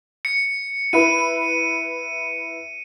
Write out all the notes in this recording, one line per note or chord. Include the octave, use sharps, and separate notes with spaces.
C#7
E4 B4 B5 D#7